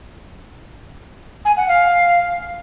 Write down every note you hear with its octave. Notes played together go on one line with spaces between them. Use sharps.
G#5
F#5
F5